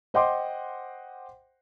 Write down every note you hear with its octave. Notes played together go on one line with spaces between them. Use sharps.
C5 D#5 F#5 G5 C6 D6